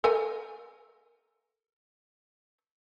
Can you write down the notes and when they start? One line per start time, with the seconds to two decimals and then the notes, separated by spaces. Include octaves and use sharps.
0.04 A4 A#4 G#5